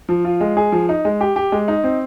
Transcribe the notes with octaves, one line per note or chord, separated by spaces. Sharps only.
F3
F4
G#3
G#4
F3
D#4
G#3
G4
G4
G#3
D#4
C4